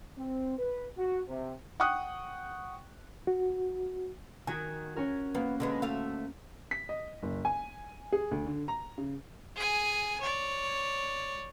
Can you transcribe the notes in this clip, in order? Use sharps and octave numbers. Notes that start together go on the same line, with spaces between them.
C4
B4
F#4
C3
F#5 G5 C#6 D#6 F#6
F#4
D#3 F#4 G#5
C#4 F#4 A#4
A#3 B3
D3 G#3 B3
D2 A3 F5
B6
D#5
F#1
G#5
G#4
D2
D3
A#5
C#3
G#4 G#5
C#5 D5